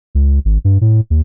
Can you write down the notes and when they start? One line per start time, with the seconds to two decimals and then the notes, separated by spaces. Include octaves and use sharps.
0.15 C#2
0.45 G#1
0.65 G2
0.81 A2
1.10 D#2